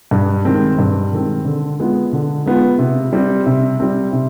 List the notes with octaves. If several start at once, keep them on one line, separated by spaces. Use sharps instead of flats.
G2
D#3 G#3 C4
G2
D#3 G#3 C4
D3
G#3 B3 F4
D3
G#3 B3 F4
C3
G3 C4
C3
G3 C4
C3